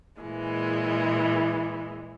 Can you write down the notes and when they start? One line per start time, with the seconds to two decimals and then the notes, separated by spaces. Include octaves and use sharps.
0.22 A#2 E3 G#3